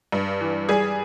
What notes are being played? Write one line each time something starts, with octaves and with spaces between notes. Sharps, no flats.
G2
E3
G3 G#4